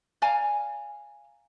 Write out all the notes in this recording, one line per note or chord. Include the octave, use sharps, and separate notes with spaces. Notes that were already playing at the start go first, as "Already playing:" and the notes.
D5 F5 G#5 A#5